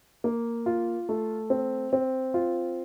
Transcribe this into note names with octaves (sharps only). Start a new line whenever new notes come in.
A#3
F4
A3
C4
C4
F4